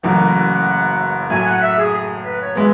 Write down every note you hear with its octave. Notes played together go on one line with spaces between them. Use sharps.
F#1 F#2 E3 A3 F#5
A2 F#3 A3 G#5
F#5
E5
G#4
G#4
B4
C#5
G#3 B3 E5